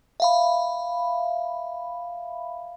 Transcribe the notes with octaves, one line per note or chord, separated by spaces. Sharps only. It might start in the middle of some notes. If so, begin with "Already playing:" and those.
E5 F5 B5